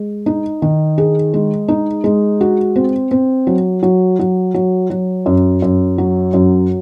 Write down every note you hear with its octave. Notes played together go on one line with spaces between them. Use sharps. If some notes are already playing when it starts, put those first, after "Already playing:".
Already playing: G#3
D#4
D#3
G#4
G#3
D#4
G#3
F#4
C4
C4
F#3
F#3
F#3
F#3
F#3
F#2
F#2
F#3
F#2